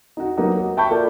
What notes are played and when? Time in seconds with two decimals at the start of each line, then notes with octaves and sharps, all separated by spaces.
0.17 D#4 F#4
0.37 F#3 A#3 B3 D#4 F#4 G4
0.58 F#4
0.77 E5 G5 A5 B5 C#6 G6
0.91 A#3 F4 A4 A#4 D5